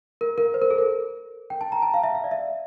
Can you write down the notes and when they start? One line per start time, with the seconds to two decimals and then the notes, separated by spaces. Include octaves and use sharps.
0.21 A#4
0.38 A#4
0.54 C5
0.62 A#4
0.70 A4
0.78 A#4
1.50 G5
1.61 A5
1.72 A#5
1.82 A5
1.94 F5
2.03 E5
2.15 F5
2.24 D5
2.31 E5